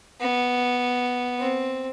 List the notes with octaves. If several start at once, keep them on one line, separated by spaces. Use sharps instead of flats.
B3
C4